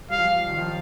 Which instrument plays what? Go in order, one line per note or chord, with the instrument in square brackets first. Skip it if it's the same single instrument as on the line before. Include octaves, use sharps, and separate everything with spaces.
[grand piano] G3 [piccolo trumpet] F5
[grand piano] F3
G3
D#3
F3